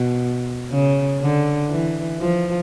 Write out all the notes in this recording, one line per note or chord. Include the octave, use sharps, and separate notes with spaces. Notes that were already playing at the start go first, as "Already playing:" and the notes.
Already playing: B2
C#3
D3
E3
F3